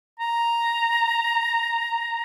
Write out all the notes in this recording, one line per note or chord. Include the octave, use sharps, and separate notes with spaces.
A#5